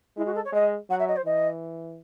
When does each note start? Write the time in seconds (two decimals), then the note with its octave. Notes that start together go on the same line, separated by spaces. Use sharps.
0.16 G#3 E4
0.25 F#4
0.35 A4
0.44 C#5
0.52 G#3 D#5
0.90 F#3 F#5
0.99 E5
1.08 D#5
1.16 C5
1.25 E3 D#5